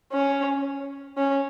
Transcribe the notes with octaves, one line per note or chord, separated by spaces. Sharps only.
C#4
C#4